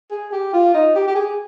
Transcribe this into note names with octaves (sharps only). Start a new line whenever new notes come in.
G#4
G4
F4
D#4
G4
G4
G#4